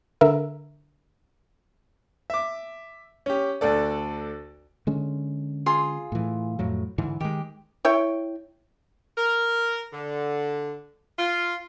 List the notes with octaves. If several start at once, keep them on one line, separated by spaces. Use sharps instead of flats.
D3 A#4 E5
E5 D6
C#4 G4
D2 D4 A4 D5
D3 G#3 C#4
F4 G#4 C6
A2 E3
F2 A2 F#3
G#2 D3 E3
D#3 G#3 G4
E4 C#5 G5
A#4
D3
F4